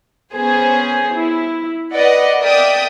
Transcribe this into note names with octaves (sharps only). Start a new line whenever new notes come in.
B3 C#4 G#4 C5
E4
B4 D5 D#5 F#5
A#4 D5 E5 G5 D#6